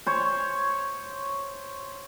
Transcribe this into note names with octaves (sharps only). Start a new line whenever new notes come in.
C5 C#5